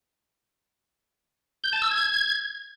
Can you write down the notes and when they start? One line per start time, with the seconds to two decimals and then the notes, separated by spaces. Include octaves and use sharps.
1.64 G6
1.73 A5
1.82 E6
1.91 G#6